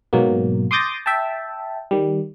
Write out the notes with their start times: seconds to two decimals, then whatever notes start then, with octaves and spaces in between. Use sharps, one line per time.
0.13 G#2 B2 F#3 A#3
0.71 C6 D6 D#6 G6 A6 A#6
1.06 E5 G5 A5
1.91 D#3 G3